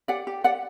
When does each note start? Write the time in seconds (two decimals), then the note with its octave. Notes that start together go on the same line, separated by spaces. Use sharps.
0.08 G4 D5 F#5
0.27 G4
0.44 G4 D5 F#5